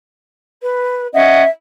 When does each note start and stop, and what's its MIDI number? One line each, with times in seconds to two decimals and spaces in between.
0.62 1.07 71
1.14 1.43 61
1.14 1.43 75
1.14 1.48 76
1.14 1.43 78